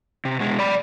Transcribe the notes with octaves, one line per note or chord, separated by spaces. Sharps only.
C3
B2 G#3
D5 B5